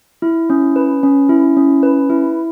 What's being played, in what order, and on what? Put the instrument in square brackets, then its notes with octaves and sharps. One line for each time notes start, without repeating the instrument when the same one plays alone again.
[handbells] E4
C#4
B4
C#4
E4
C#4
B4
E4